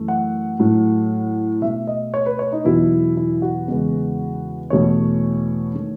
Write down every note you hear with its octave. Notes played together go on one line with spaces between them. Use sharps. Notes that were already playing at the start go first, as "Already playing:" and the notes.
Already playing: F#2 E3 A3
F#5
A2 F#3 A3
B2 A3 E5
D#5
C#5
B4
C#5
D#4
E2 B2 F#3 E4
E4
F#4
E2 C#3 G#3 B3
E2 B2 A3 C#5
D#3 A3